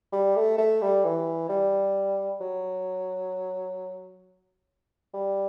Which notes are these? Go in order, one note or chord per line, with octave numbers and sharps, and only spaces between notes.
G3
A3
A3
G3
E3
G3
F#3
G3